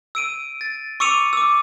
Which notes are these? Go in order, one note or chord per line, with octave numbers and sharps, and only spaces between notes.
E6 D7 D#7
A6
C#6 D6 E6 C#7 D#7 F7
D6 E6